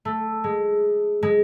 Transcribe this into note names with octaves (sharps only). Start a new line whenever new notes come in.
A3
G#3
G#3